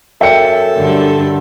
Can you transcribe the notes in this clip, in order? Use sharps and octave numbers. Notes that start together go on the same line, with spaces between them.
F#2 A4 E5 G5 C#7
G2 D3